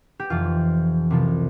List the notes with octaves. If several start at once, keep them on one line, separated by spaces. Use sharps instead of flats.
G4
F1 F2 E3 F4
C2 C3 F3